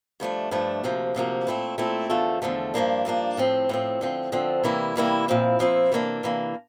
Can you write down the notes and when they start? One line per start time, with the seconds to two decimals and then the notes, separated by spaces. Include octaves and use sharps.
0.20 G2 F3 A3 D4
0.51 G2 F3 A3 D4
0.84 D2 C3 F3 A#3
1.15 D2 C3 F3 A#3
1.47 A#2 A3 C4 E4
1.78 A#2 A3 C4 E4
2.10 E2 D3 F3 A3
2.42 E2 D3 F3 A3
2.74 G2 F3 A#3 D4
3.05 G2 F3 A#3 D4
3.37 A2 F3 C4
3.69 A2 F3 C4
4.01 D3 F3 C4
4.32 D3 F3 C4
4.64 C3 E3 G3 A#3 E4
4.96 C3 E3 G3 A#3 E4
5.28 A#2 F3 C4 E4
5.59 A#2 F3 C4 E4
5.92 C3 E3 A#3 D4
6.23 C3 E3 A#3 D4